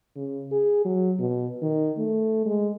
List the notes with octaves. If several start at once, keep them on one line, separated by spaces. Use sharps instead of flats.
C#3
G#4
F#3
B2
D#3
A3
G#3